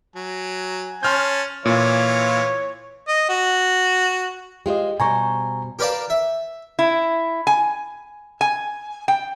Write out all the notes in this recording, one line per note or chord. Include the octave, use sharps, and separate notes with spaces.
F#3 G#5
C#4 A5 C6 F6 G6
A#2 E3 F4 C#5
D#5
F#4
G#3 F4 G4 C5 D#5
B2 G3 C5 G#5 A#5 C#6
G4 A#4 B4 D5 F5 A5
E5
E4
G#5
G#5
G5